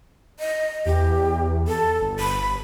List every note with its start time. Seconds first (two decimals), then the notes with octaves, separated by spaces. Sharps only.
0.40 D#5
0.86 E2 G4
1.68 A4
2.01 G1
2.20 B5